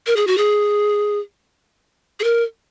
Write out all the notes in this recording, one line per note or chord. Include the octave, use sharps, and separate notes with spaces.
A#4
G#4
F#4
G#4
G#4
A#4